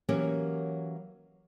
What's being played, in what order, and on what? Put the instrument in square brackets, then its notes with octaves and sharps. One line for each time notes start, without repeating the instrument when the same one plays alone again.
[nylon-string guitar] E3 F#3 A#3 C#4 G4 A#4